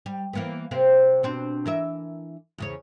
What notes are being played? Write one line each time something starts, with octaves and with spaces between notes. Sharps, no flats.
G3
E3 A#3 B3
C3 A#3 C4
B2 C4 D4
E3 A#4 E5
E2 C#3 C#5